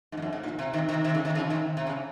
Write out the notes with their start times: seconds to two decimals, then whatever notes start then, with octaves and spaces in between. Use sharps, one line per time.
0.12 G#2
0.17 F2
0.22 F#2
0.33 G#2
0.43 A#2
0.59 C3
0.73 C3 D#3
0.89 C3 D#3
1.04 C3 D#3
1.14 C#3
1.25 C3 D#3
1.35 C#3 F3
1.50 C3 D#3
1.77 C3
1.87 C#3